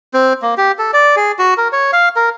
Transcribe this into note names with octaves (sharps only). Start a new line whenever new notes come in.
C4
A#3
G4
A4
D5
G#4
F#4
A#4
C#5
F5
A#4